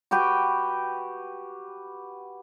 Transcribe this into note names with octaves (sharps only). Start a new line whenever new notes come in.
F#4 G4 B4 G5